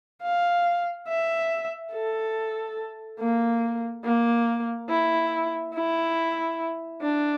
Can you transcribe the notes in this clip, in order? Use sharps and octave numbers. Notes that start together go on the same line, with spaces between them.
F5
E5
A4
A#3
A#3
E4
E4
D4